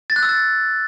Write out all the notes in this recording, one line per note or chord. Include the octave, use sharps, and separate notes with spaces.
A6
F#6
E6
A6